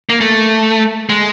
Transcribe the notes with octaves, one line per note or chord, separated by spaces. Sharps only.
A#3
A3
G#3